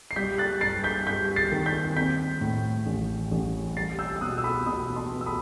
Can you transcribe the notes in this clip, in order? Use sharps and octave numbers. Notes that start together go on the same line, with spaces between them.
C7
G3 G6 B6
F#6 A6
G2 A6 C7
G6 B6
G2 G6 B6
A6 C7
D#3
G6 B6
C4 G6 B6
A2
A1
A1
G3 A6 C7
E6 G6
E6
B2 D#6 F#6
E6
B5 D#6
B2 B5 D#6
A5 C6
B3
E6
B5 D#6